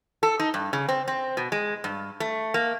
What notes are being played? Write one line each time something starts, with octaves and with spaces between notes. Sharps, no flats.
A4
D#4
G2
C#3
C4
C4
B2
G#3
G2
A3
A#3